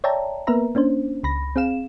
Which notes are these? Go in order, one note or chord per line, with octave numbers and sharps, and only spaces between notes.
C#5 D5 E5 G5 A5 A#5
A#3 B3 A#4 B4 E5 A#5
A#3 C#4 D4 C5
C#2 B5 A#6
C4 G#4 F5 E7